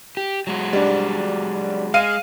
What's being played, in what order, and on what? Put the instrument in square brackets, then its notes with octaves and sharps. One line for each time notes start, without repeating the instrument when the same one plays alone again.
[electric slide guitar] G4
F#3 G#3 F#4
[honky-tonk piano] G3 D4
[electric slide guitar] G#3 [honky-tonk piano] F5 D#7